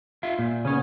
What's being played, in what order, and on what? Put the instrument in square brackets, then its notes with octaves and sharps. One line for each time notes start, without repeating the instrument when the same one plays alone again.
[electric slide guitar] F4 E5 F5
A#2
[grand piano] C#3 B3 [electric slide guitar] C#4 C#5